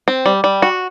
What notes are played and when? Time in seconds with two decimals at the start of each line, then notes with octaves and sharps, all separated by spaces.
0.08 C4
0.26 G3
0.44 G3
0.62 F#4